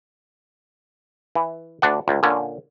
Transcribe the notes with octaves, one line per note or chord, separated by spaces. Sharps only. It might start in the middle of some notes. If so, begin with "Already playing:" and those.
E3
D2 D4 F#5
C#2
A#2 D3 C#4